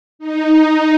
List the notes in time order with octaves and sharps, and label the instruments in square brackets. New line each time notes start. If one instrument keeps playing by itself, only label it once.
[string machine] D#4